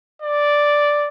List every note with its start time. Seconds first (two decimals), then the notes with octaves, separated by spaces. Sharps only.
0.22 D5